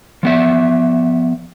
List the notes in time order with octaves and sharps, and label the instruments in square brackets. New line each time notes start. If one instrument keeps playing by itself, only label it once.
[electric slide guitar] F3 B3 E5